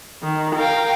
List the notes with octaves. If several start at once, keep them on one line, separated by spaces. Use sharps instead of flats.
D#3
A#4 F5 G5